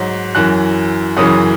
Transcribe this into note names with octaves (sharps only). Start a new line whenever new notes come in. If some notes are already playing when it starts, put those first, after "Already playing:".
Already playing: G#2 F#3
F#2 E3 F#6
F#2 C#3 E3 D#6